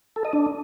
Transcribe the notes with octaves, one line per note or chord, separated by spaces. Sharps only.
A4
D#5
D4